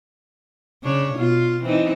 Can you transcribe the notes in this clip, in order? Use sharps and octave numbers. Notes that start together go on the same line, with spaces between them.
C#3 D4 C#5
B2 F4
E3 C4 D#4